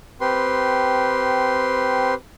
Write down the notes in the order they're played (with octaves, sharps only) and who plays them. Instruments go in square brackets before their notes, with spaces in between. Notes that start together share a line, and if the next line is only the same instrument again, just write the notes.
[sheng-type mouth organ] C4 G4 B4 C6